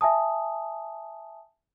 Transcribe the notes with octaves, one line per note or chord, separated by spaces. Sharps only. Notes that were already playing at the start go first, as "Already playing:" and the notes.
E5 G#5 A5 D#6